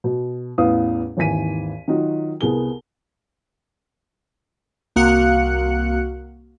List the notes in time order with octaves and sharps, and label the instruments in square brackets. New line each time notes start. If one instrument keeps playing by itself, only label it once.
[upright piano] B2
A1 E2 B3 F5 D#6
G#1 D#2 E3 G#5 B6 D#7
D#3 F#3 D#4 F4 F#4
C2 B3 G#4 A#4 G7
[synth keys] C2 A#3 F#4 F5 F#6 C#7